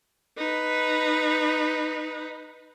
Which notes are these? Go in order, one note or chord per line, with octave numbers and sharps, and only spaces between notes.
D#4 B4